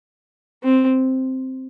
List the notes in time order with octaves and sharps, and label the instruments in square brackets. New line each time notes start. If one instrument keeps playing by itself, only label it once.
[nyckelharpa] C4